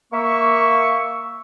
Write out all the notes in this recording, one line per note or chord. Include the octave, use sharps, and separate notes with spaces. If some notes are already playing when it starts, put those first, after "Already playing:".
A#3 E5 C#6